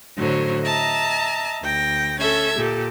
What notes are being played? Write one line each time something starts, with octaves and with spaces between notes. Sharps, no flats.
A2 D3 F#3 C5 C#5
D#5 E5 A5 A#5
D2 G5 A#6
C#4 A4 E5 G#6
A#2 G4 A4